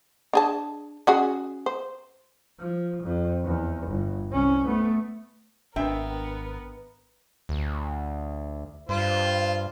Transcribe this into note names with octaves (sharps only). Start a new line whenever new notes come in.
D4 G#4 A5
C#4 F#4 G#4
C5
F3
F2
E2
G1
C2 C#4
A3 B3
G#1 B3 C4 D4 A#4 D#5 E5 G5
D2
G2 F4 C5